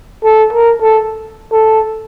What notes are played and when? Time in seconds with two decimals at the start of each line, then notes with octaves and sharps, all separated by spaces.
0.24 A4
0.53 A#4
0.81 A4
1.52 A4